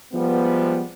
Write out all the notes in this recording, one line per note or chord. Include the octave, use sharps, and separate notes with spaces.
F3 G3 G#3 B3